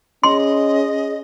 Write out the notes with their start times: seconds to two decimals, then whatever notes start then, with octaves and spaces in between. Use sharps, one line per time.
0.23 C#4 G#4 D#5 C6